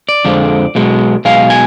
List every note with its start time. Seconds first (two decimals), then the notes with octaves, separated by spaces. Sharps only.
0.09 D5
0.25 F2 D3 F3 G#3
0.75 B1 B2 G#3
1.25 B1 B2 G#3 F5
1.50 G#5